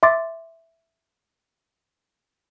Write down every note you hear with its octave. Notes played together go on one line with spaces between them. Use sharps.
E5 C6 D6 A6